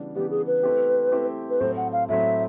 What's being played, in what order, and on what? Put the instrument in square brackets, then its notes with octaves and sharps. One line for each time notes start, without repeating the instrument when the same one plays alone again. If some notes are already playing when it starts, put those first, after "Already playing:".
Already playing: [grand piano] C#3 E3 G3 B3 D4
[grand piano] C#3 E3 G3 B3 D4 [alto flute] G4
[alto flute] G#4
B4
[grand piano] A3 C4 E4 G4
A3 C4 E4 G4
[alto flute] B4
[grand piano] A2 F#3 A3 C4 [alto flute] C5
[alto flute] F#5
F5
[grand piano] A2 F#3 A3 C4 [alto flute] E5